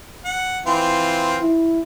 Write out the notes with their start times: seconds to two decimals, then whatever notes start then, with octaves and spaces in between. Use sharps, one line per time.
0.25 F#5
0.66 E3 C4 F4
1.41 E4